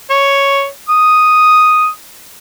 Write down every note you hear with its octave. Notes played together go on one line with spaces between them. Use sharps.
C#5
D#6